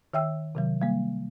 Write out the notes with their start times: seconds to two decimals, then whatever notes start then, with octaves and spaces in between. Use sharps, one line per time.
0.13 D#3 E5 G5 E6
0.55 C3 D#3 F#3
0.81 G3 A#3